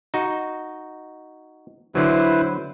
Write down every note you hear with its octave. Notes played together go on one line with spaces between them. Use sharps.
D#4 F#4
D3 F#3 E4 B4 C5